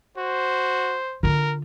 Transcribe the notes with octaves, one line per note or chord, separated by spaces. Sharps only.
F#4 C5
D3 F4 A#4